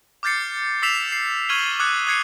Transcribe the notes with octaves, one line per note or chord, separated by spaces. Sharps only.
D6 F6 G6 A6 C7 C#7
D6 E6 B6 C7 E7 F7
C7
C#6 F6 G#6 D#7 F#7 G7
D6 D#6 F#6 G#6 C#7
D#6 F#6 G#6 C7 C#7 D#7